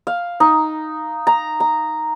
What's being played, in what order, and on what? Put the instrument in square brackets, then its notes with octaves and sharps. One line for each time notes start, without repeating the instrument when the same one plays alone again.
[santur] F5
D#4
A#5
A#5